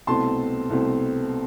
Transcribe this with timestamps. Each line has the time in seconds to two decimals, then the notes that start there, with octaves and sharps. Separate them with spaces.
0.07 C2 B2 A3 C4 A5 C6
0.70 C2 B2 A3 C4